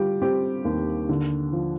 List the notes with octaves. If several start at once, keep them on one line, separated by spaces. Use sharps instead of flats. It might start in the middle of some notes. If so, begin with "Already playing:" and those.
Already playing: D3 G3 F4 G4
C4 G4
D#2
D3
F3